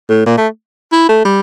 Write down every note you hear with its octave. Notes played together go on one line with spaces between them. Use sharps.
A2
A#2
A3
E4
A3
G3